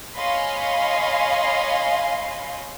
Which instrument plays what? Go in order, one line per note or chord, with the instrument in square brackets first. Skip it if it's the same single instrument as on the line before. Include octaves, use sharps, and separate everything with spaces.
[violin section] C#5 D#5 F5 G#5 B5 C6